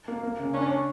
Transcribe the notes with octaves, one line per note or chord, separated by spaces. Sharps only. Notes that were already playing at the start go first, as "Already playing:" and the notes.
A#3
A#3
C#3
C#4 D4
D4